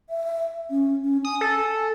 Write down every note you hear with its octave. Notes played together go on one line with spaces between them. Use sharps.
E5
C#4
C#4
G#5 D#6
A4